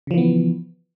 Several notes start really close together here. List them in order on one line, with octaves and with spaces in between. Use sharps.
C#3 F3 E3 B3